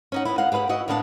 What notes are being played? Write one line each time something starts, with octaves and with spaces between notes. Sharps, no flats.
C#4 D#4 F#5
B3 E4
G#3 F5 F#5
G4 G#4 B4 F5 F#5
E4 F#4 D#5 F#5
A2 A#3 B3 D4 F5 A5